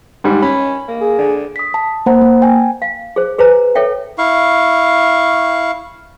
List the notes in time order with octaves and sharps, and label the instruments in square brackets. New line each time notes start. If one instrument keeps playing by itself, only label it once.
[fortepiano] G#2 G3
[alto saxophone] C#4 [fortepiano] B5
[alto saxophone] A#3
[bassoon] G#4
[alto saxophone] D3
[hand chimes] D#6 B6
A5
A#3 C5 F#5 A#5
A#3
G5 G#5
[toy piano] F5
G#4 C5
G#4 B4 C5 G#5 A#5
A4 C#5 E5 G5
[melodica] E4 F5 C#6